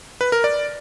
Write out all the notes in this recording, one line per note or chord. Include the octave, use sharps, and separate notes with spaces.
B4
A#4
D5